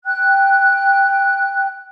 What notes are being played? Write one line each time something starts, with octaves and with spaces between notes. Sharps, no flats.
G5 F#6